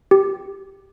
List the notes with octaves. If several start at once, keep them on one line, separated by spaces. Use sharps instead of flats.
G4